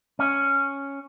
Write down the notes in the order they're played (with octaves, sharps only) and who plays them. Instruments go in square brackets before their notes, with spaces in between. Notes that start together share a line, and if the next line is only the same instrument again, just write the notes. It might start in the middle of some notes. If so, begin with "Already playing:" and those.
[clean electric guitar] C#4